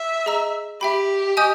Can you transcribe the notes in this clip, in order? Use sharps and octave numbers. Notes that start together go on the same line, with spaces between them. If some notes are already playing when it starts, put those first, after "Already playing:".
Already playing: E5
G#4 D#5 A#5 E6
G4 E5 G5 B5
D#5 G#5 D#6 G6